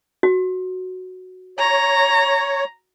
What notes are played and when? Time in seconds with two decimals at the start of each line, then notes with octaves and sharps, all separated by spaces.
0.23 F#4
1.59 C#5 A#5